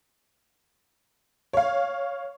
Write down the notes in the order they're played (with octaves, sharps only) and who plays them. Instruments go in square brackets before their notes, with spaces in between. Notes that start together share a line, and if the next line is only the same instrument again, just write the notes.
[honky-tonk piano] C#5 F5